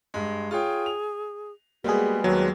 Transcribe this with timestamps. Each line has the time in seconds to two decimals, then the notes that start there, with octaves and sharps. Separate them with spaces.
0.14 G2 G#3
0.51 F4 G#4 C#5 G5
0.86 F7
1.84 G3 G#3 A#3 B3 F#4 G#4
2.24 D#2 F#3 B4